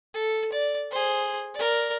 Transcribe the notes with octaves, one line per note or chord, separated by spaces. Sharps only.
A4
D5
G#4 C5
A#4 D5